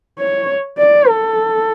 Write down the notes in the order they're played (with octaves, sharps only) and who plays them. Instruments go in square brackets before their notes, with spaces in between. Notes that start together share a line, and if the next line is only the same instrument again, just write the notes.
[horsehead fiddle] C#5
D5
A4